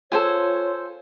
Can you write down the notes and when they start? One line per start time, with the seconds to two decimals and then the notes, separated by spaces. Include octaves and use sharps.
0.12 F4 A4 C5 C#5 G#5